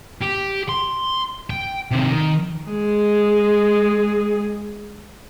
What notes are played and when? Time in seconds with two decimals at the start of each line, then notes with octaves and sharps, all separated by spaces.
0.21 G4
0.69 C6
1.50 G5
1.91 C3 D#3
2.10 D#3
2.69 G#3 G#4